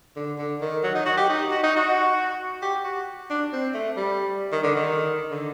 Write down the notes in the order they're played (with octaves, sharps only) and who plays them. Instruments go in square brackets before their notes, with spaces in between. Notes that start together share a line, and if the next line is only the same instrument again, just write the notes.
[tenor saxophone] D3
D3
D#3
F#3
D#4
F#4
G4
D#4
F#4
D#4
F#4
G4
F#4
D4
C4
A3
G3
D#3
D3
D#3
D3